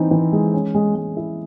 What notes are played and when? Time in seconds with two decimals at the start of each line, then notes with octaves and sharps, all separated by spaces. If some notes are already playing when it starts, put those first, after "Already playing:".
Already playing: E3 C4 D#4
0.11 E3
0.32 G#3
0.54 C#4
0.74 G#3
0.95 G#3
1.17 E4